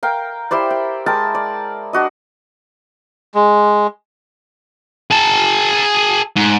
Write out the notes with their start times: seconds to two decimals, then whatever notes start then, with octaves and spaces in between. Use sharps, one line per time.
0.03 A#4 F5 G5
0.51 E4 G4 C5 D5
0.70 G5
1.06 G#3 A#4 G5 A5
1.35 D5
1.93 D4 F#4 D#5
3.35 G#3
5.11 G#4 A5
6.36 G#2